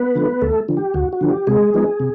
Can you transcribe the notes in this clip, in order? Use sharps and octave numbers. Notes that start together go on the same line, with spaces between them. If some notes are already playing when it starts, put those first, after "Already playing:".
Already playing: B3 B4
D3 F3 A3
D2 A3 A4
D3 F3
G4
D2 F#4
F#4
D3 F3
G4
C3 G#3 G#4
F3 G#3 B3 D#4
C3